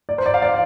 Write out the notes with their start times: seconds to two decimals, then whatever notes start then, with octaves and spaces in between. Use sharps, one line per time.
0.09 D5
0.18 C5
0.26 D5
0.34 F5
0.42 D5